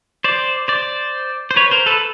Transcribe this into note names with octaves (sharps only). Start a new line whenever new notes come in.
C5 D5
C5 D5
C5
B4 C#5
A#4 C5
A4 B4